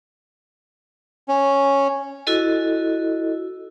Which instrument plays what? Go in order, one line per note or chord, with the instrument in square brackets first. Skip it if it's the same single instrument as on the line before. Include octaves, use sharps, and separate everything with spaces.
[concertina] C#4
[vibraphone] E4 F#4 A4 D#5